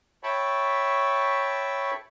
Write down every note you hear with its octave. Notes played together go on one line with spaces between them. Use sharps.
C#5 E5 G5 A5 B5 C#6